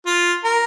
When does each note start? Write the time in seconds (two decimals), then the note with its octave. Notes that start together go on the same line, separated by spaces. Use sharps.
0.06 F4
0.44 A#4